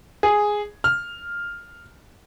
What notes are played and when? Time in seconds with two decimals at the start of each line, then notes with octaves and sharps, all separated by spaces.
0.23 G#4
0.84 F6